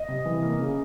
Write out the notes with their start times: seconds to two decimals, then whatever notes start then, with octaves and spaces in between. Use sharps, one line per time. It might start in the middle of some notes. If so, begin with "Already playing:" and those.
Already playing: D#5
0.08 C3
0.25 E3
0.43 A#3
0.60 C#3